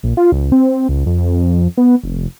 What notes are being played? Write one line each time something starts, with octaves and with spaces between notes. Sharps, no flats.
A#1
F4
C#2
C4
C#2
F2
B3
F1